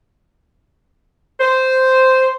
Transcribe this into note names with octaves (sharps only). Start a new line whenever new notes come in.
C5